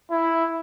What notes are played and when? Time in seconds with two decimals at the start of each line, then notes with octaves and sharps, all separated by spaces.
0.11 E4